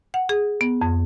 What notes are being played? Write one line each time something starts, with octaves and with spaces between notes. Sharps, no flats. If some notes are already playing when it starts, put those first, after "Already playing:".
F#5
G#4
B3
F2